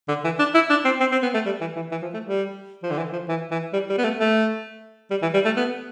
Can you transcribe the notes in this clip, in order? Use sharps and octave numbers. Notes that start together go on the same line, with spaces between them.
D3
E3
D4
E4
D4
C4
C4
C4
B3
A3
G3
E3
E3
E3
F3
A3
G3
F3
D3
E3
F3
E3
E3
G3
G3
B3
A3
A3
G3
E3
G3
A3
B3